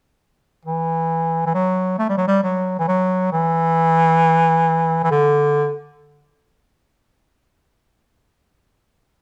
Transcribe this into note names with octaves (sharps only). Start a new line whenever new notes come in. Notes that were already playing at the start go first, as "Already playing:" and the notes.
E3
E3
F#3
A3
G3
F#3
G3
F#3
E3
F#3
E3
E3
D3